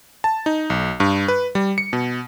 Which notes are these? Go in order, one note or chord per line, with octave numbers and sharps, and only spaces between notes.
A5
D#4
B1
G2
B4
G3
C#7
B2